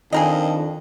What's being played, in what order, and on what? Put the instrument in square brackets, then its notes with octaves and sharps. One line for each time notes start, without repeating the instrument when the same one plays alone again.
[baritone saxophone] F2 [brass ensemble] D#3 D4 [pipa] G#4 A#4 D#5